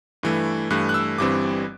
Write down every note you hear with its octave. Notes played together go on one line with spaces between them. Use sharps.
G2 E3 A3
G2 E3 A3 F#6
F#6
E6
G1 G2 E3 G3 C4 D6